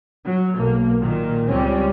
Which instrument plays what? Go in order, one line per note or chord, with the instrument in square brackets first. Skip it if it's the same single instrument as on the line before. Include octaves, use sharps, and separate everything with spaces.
[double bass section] F#3
B1 A#3
A#2 D#3
C#2 G3 C4 C#4